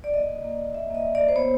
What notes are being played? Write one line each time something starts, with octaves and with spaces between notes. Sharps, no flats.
D5
A#3 D#5
A#3
A#3
A#3
A#3 E5
A#3 D#5
A#3
D5
A#3
C5
B3 C#5